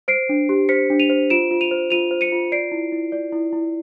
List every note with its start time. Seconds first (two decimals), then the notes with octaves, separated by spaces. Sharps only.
0.08 C5 C7 D7
0.29 D4
0.49 G4
0.69 C5 B6 C#7
0.90 D4
1.00 D#7 F7
1.10 C5
1.30 F4 D7 E7
1.51 F4
1.61 D#7 F7
1.71 C5
1.90 F4 D#7 F7
2.11 C5
2.21 C#7 D#7
2.32 F4
2.52 D5 C7 D7
2.72 E4
2.92 E4
3.12 D5
3.32 E4
3.53 E4